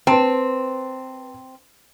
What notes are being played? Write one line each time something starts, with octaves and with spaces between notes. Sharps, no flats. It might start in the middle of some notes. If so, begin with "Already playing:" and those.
C4 B4 A5